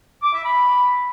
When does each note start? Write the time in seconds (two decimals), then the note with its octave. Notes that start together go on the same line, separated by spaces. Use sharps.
0.23 D6
0.33 E5
0.44 B5